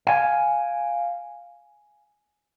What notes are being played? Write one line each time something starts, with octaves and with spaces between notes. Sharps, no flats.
F5 G#5